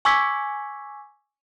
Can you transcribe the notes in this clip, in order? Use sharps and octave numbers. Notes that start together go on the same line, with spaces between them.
G#5 C#6 D6 E6 G#6 B6